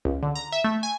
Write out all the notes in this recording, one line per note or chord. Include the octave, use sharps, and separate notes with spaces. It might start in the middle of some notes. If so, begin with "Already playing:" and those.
C#2
D3
A#5
E5
A3
G#5